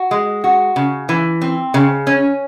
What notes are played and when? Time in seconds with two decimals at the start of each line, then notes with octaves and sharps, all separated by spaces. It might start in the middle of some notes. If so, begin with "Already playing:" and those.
Already playing: F#4
0.11 G#3
0.44 F#4
0.76 C#3
1.09 E3
1.42 C4
1.74 C#3
2.07 C#4